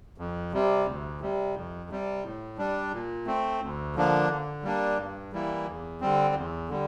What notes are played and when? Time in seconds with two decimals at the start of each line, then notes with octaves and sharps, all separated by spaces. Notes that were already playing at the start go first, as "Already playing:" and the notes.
0.18 F2
0.53 C3 G3
0.86 D2
1.21 C3 G3
1.55 F2
1.90 C3 G3
2.23 A2
2.58 G3 D4
2.93 A#2
3.26 A3 C4
3.61 D2
3.95 D3 F3 A#3 D4
4.30 D3
4.63 G3 A#3 D4
4.98 G2
5.33 E3 G3 A#3 E4
5.67 E2
6.01 D3 G3 C4
6.35 E2
6.69 D3 G3